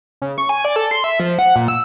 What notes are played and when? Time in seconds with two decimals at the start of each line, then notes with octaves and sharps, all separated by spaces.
0.22 C#3
0.38 C#6
0.49 G#5
0.65 D5
0.76 A4
0.91 C6
1.04 E5
1.20 F3
1.39 F#5
1.56 A#2
1.68 E6